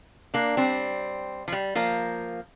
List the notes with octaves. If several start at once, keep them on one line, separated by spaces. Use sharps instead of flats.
A#3 D4
G3 C4
F3
G3
F3 A#3